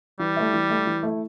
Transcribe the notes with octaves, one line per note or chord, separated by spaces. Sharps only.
E3 G3
A3 E4
E3
A3 E4
E3
A3 E4